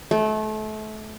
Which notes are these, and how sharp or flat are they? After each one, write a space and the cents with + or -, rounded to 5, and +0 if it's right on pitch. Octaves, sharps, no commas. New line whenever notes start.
A3 -30